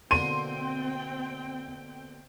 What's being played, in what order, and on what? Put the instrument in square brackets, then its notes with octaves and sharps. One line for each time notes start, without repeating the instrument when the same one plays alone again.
[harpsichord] B2 D3 A#3 [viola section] C4 G5 [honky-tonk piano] C6 [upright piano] D#7